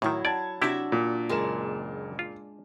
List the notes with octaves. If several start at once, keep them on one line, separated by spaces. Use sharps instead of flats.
A2 D#3 F#3 E4
D5 F#5 A5 G#6
C3 D4 E4 F#4 G4 E5
A#2
F#1 G#3 D4 A#4 E7
F4